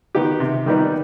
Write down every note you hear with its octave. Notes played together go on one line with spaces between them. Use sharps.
D#3 B3 D#4 G4
C3
D#3 G3 B3 D#4